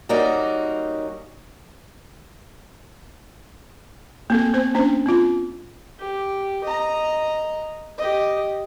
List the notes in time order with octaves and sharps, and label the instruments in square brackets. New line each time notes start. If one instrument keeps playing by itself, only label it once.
[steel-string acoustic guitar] G3 A#3 C#4 D#4 F#4
[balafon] A#3 C4 A4
B3 C4 C5
A#3 C#4 D4 C5
C4 F4
[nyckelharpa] G4
D#5 A#5
G4 D#5